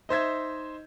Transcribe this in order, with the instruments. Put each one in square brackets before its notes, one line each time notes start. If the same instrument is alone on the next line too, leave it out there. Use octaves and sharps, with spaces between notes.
[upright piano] D#4 C5 E5 G#6